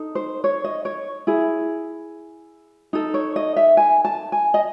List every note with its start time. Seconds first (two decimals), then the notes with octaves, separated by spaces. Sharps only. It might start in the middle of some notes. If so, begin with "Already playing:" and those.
Already playing: D#4 A4
0.15 C5
0.44 C#5
0.64 D#5
0.85 C#5
1.27 E4 G#4
2.93 D#4 A4
3.14 C#5
3.36 D#5
3.56 E5
3.77 G#5
4.05 A5
4.32 G#5
4.54 D#5